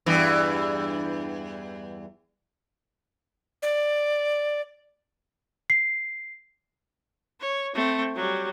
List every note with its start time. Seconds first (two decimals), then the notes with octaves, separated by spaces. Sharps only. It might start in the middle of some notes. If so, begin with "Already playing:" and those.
0.06 E2 G2 E3
3.62 D5
5.70 C7
7.41 C#5
7.75 A3 C4
8.15 F#3 G3